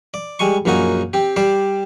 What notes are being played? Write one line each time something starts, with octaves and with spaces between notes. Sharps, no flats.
D5
G3 G#3 G#5 C#6
A#1 F#2 A#3 D#4 F#4 G#5
C4 G4
G3 G4 C5 D5